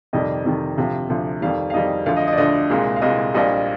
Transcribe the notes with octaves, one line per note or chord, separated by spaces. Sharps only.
F2 C3 D#3 G3 D#5
F2 C3 D#3 G3
D2 C3 F3
D2 C3 F3
F2 D#3 G3 F5
F5
F2 D#3 G3 D#5
D2 D3 F3 F5
D#5
D#5
D5
D2 D3 F3 D#5
C2 A#2 G#3
F5
C2 A#2 G#3 D#5
A#1 A#2 G3 D#5